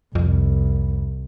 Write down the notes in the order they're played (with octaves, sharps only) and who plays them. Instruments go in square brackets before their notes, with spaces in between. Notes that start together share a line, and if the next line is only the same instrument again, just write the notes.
[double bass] C2 [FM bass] F2